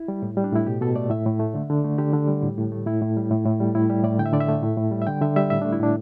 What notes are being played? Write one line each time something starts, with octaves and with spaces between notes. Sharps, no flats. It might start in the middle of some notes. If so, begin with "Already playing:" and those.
Already playing: E4
G3
A2
G3
D4
A2 E4
B2 G4
B2 A4
A3 D5
A2 E5
A2
A3
D3
D3
A3
D3 G4
D3
G3
A2
A2
A3
A2 E4
A2
G3
A2
A2
G3
A2 E4
G3 G4
A2 D5
D3 G5
E5
D3 D5
E5
A3
A2
A2
G3
E5
D3 G5
D3 E5
G3 E5
A2 E5
A3 D4
E4
A2 D4